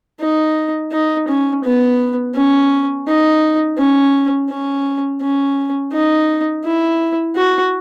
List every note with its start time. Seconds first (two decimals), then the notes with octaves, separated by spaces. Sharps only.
0.21 D#4
0.92 D#4
1.28 C#4
1.64 B3
2.35 C#4
3.07 D#4
3.78 C#4
4.49 C#4
5.22 C#4
5.93 D#4
6.64 E4
7.36 F#4